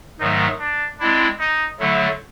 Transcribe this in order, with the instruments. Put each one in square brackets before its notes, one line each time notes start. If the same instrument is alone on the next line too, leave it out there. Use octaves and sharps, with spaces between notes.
[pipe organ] G#2 D#3 F#3 A3 [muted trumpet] D#4
[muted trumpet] D4
[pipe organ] G#3 C4 E4 [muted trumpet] D4
[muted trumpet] D#4
[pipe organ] D3 F#3 A3 [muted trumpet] E4